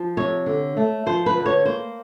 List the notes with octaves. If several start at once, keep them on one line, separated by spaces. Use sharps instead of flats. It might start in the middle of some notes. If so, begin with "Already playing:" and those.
Already playing: F3
C3 C#5
D3
A3
F3 C5
B4
D3
C#5
A#3 C5